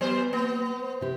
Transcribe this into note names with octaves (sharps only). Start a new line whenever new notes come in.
F#3 B3 B4 C5
A#3 B3
C5
C3 G4